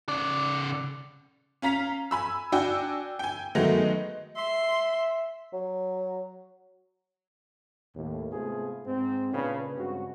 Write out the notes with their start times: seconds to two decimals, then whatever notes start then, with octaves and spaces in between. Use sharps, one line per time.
0.09 C#3 D5
1.62 C#4 F5 A#5 B6 F7
2.11 G#5 B5 E6
2.52 D4 F#4 G5 G#5 E6
3.19 G5 G#5
3.55 D#3 F#3 G#3 A3 B3 D#4
4.36 E5 C6
5.53 F#3
7.95 D#2 A2
8.31 G#2 C3 A3 B3 F4 G#4
8.86 G#2 C4
9.33 A#2 C#3 D4 B4
9.76 G2 C#3 G#3 C4 F#4